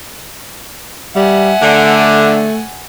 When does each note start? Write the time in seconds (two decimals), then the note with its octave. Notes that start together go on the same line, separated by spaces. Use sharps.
1.16 G3 E5 F#5 G#5
1.61 D3 A3